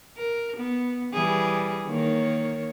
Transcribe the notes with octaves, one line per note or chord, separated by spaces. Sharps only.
A#4
B3
E3 G3 G#4
D#3 A#3 C#5